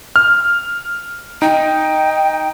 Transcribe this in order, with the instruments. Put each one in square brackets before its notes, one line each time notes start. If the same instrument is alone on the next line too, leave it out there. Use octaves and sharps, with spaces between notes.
[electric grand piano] F6
[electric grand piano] D#4 [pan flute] G5